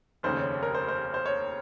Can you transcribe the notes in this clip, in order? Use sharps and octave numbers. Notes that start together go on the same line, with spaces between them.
F1 D#2 C#3 C5
C#5
A#4
C5
C5
C5
C#5